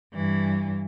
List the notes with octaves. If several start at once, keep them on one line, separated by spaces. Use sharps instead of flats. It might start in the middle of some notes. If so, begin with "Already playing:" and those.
G2 E3